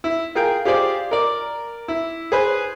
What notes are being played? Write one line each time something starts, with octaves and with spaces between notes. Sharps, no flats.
E4
F4 G#4 A#4 G5
F4 G4 G#4 C5 D5
A#4 D5
E4
G#4 B4 C5